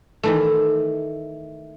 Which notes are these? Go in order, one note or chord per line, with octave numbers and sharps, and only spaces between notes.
D#3 E3 A3